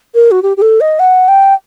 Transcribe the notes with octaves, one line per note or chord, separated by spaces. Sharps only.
A#4
F#4
G4
G4
A4
D#5
F#5
G5